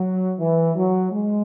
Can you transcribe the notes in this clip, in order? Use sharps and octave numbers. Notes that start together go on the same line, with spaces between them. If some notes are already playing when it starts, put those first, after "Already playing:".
Already playing: F#3
E3
F#3
G#3